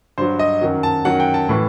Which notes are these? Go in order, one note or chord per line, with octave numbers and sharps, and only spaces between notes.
G2 F#3 C5
D#5
F#2 D#3 F#3
A5
F#2 D#3 F#3 F#5
G5
A5
A2 E3